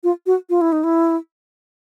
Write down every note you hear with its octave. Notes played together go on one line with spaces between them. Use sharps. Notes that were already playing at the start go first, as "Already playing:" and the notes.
F4
F#4
F4
E4
D#4
E4